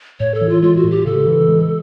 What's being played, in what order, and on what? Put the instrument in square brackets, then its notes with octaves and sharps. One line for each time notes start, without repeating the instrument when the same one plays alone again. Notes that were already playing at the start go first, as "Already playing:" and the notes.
[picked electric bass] A2 [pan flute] C#5
[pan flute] A4
[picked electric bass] E3
[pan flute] F4
[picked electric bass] G#3 [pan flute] F4
[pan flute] F#4
[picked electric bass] A2
[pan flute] G4
[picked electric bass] C#3 [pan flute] A4
[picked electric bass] E3
G#3